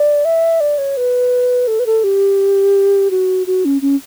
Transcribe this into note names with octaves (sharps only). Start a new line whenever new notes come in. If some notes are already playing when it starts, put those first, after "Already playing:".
Already playing: D5
E5
D5
C#5
B4
A4
B4
A4
G4
F#4
F#4
C#4
C#4